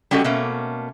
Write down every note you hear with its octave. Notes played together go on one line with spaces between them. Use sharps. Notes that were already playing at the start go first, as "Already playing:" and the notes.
G3 C#4 F#4 G4 A4 D#5
B2 A3 A#3 C#4